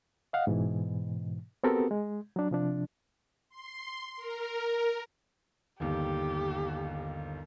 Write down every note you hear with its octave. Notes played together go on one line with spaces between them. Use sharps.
D#5 F5 F#5
G#2 B2 E3
B3 C4 F#4 G4 A4 A#4
G#3
F#3 D4
C3 F3 D4
C6
A#4
G1 D#2 G4